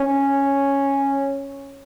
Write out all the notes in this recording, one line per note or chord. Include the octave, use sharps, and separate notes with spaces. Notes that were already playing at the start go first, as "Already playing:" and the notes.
Already playing: C#4